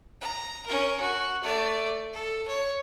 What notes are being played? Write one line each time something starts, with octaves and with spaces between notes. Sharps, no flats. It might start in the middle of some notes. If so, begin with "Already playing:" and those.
A#5
C#4 A#4
F#4
A3 D5
A4
C#5